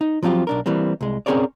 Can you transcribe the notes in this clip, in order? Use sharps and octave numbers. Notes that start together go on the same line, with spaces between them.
D#4
F3 F#3 C4 F4 G4
B1 D4 A#4
E3 G3 A#3 C4
C2 G#3
C4 C#4 G#4 A#4 C#5 D5